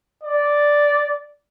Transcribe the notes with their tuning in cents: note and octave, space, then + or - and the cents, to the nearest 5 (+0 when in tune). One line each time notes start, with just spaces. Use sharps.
D5 -5